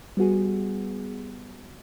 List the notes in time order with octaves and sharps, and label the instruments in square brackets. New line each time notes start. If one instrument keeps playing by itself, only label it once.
[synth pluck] G3 B3 F#4 G#4